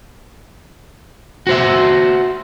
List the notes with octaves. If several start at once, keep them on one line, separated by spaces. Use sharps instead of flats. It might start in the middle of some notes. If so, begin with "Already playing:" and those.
F#4 C5 E5